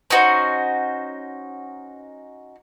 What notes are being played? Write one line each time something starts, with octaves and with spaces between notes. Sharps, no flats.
C#4 D#4 F#4 C5